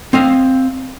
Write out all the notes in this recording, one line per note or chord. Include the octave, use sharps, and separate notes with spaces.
C4 D#5 F5